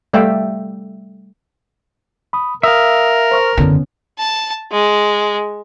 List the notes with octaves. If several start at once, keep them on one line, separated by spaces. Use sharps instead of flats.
G3 A3 D5 E5 F5 G5
B5 D#6
A#4 E5 F5 D#6
C5 C#6 F6
F#1 E2 D3 B3 C#4
A5
G#3